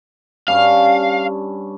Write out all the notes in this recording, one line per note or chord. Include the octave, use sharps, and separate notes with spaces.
G2 C#4 F5